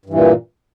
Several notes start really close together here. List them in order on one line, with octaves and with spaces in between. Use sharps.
G2 E3 A#2